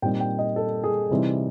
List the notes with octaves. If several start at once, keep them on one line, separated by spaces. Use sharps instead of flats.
A#2 G3 C4 D#4 G5
G5
D#5
A4
G#4
C3 E3 G3 C4 D#4